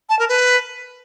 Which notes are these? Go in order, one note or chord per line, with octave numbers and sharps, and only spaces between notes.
A5
A#4
B4